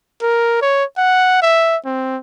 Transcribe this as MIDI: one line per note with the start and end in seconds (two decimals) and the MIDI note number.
0.22 0.61 70
0.62 0.84 73
0.98 1.39 78
1.42 1.77 76
1.85 2.18 60